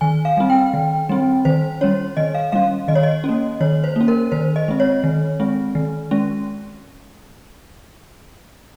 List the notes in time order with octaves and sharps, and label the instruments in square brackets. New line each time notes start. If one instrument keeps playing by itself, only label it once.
[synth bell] D#3 G#5
F5
G3 C4
G5
D#3
G3 C4
D#3 C5
G3 C#4 C#5
D#3 D#5
F5
G3 C#4 F5
D#3 D#5
C#5
D#5
C#4
A#3
D#3 C#5
C5
A#3 C#4
A#4
D#3 C5
D#5
G#3 C4
C#5
D#3
G#3 C4
D#3
G#3 C#4